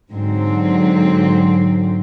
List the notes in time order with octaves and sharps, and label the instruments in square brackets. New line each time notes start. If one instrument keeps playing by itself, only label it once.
[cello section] G#2 D3 F#3 C4